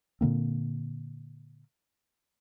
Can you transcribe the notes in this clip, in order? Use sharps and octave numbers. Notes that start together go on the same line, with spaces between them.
A#2 D3 A#3 C4